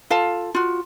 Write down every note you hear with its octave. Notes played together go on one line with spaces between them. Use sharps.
F4 A4 F5 A5
F4 F#4